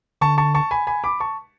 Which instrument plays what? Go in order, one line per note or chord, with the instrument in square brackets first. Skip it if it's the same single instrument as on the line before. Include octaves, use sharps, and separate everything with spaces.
[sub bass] D3 [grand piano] A5 C#6
[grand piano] A5 C#6
A5 C#6
G#5 B5
G#5 B5
B5 D6
A5 C#6